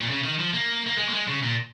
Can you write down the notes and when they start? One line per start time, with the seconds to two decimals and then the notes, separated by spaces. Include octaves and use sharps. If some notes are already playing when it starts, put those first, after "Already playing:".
0.01 A#2
0.09 C#3
0.24 D#3
0.39 F3
0.54 A#3
0.86 A#3
0.98 G#3
1.09 A#3
1.13 G#3
1.28 C#3
1.43 A#2